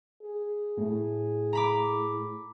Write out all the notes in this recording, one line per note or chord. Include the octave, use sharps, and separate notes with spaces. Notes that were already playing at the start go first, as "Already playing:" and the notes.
G#4
A2
A#5 B5 D6